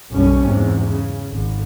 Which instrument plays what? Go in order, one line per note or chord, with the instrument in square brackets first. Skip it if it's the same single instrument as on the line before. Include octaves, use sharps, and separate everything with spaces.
[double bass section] F#1 B1 F#2 B2 G3 C#4
E2 G#2 C3
C#3
G#1